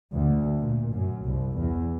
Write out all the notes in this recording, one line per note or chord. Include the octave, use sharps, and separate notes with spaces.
D2
A#2
F#2
C2
E2